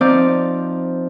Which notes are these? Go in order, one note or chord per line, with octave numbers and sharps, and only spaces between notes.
F3 C4 D#4 D5 D6 F6